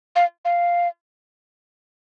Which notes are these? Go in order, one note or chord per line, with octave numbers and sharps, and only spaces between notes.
F5
F5